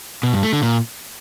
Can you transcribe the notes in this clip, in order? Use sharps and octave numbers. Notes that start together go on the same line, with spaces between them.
B2
G2
A3
D3
A#2